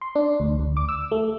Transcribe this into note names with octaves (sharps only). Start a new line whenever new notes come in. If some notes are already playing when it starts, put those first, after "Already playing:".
C6
D4
D2
D2
D6
E6
A3